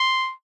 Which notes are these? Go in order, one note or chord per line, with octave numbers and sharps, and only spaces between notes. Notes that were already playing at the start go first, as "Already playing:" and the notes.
Already playing: C6